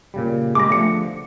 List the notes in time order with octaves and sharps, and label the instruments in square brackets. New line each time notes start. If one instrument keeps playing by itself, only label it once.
[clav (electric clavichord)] A#2 C#3 G3
[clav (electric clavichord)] G3 G#3 [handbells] D6 A#6
[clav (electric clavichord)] D3 F3 [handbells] A3 C#7